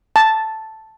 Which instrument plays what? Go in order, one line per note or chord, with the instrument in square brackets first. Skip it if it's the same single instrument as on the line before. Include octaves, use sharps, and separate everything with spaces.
[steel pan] A5